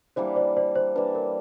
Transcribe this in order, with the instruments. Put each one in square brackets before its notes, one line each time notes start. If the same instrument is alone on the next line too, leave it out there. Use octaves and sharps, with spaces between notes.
[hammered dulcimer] E3 G3 A#3 D4 [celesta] C5 D5
[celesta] C5 D5
C5 D5
C5
[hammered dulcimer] E3 G3 A#3 D4 [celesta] B4
[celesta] A#4